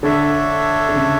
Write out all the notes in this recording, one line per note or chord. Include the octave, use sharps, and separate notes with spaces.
D3 D4 A4 C#5 E5
D3
C#3